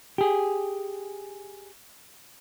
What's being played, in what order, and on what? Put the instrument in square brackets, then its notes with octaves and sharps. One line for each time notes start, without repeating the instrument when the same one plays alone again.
[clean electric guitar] G4 G#4